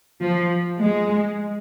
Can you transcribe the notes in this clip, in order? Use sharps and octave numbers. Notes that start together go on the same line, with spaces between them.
F3
G#3